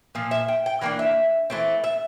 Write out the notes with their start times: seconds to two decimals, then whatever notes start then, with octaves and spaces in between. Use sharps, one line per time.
0.15 A#2 F3
0.31 E5
0.48 G5
0.66 G5
0.81 E3 A#3 D4 G5
0.99 E5
1.50 E3 A3 C4
1.84 E5